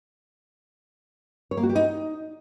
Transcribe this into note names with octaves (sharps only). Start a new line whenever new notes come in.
C#5
A#3
F#4
G4
D#4